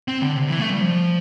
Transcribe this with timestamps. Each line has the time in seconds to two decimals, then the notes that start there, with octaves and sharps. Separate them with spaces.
0.08 C4
0.22 D3
0.36 C3
0.49 E3
0.59 A3
0.70 G3
0.81 F3